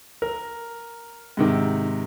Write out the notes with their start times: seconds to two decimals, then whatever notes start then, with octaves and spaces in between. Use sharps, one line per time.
0.22 A#4
1.37 G#2 C3 D#3